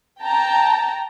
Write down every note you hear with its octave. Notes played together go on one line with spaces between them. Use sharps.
G5 A5 A#5